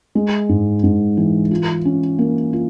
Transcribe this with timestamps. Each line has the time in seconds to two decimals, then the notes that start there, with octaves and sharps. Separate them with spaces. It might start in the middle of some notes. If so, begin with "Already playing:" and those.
0.15 G#3
0.49 G#2
0.83 G#2
1.17 E3
1.51 F4
1.85 C#4
2.19 A#3
2.53 F4